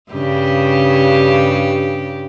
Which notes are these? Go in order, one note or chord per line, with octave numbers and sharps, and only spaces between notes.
G2 C#3 G4